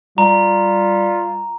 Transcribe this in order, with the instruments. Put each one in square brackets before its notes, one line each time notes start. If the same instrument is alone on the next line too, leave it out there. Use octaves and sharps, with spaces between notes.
[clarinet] G3 [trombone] F4 [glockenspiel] A#5